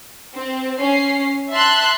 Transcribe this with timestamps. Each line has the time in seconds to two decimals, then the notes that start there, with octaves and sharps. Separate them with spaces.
0.34 C4
0.79 C#4 C7
1.50 E5 A5 C6 F#6